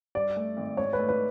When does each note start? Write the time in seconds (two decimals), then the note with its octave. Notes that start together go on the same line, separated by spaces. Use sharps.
0.15 G2 D5
0.36 A3
0.57 G#1
0.77 G#2 C#5
0.93 B4
0.98 A3
1.09 B4